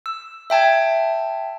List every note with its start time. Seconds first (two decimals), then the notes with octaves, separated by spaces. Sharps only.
0.06 E6
0.50 E5 G5 A5 G#6